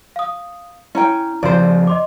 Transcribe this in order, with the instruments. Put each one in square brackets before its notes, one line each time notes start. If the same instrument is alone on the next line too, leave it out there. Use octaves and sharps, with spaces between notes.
[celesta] F5 D#6
[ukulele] C#4 G5 [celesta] E4 A#5
[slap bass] F2 C#3 F3 [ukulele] C5 D5
[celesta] D#5 C6 D6